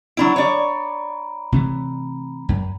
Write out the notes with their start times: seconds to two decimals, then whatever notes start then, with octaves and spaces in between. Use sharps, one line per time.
0.17 F#3 D4 E4 A#5 B5 D7
0.36 C#5 D5
1.52 C3 E3 A3
2.49 F#2